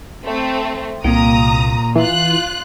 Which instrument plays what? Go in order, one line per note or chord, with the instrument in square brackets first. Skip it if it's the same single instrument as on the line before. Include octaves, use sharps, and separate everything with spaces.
[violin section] A3 C4
[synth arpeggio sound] C2 [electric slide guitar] A#2 A#3 G5 [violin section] A#5 D#6
[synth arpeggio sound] E3 [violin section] F4 F#6